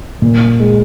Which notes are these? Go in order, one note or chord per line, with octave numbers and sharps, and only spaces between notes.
A#2
G#3